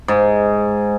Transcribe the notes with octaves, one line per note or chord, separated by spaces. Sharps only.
G#2